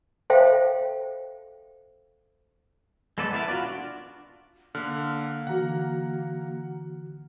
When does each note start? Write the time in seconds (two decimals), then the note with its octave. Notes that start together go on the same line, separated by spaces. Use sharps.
0.30 A4 C5 E5 F5 G5
3.18 G#3 B3 A4 B4 D5
3.33 B3 E4 A#4 A5
3.48 F4 F#4 D5
3.64 D4 F4 F#4
4.75 D3 A#3 F6 F#6
5.47 D3 E3 F#4 F#5 A#5